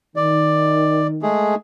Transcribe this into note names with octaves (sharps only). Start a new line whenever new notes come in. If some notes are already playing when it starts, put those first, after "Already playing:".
D#3 D5
G#3 A3 G#4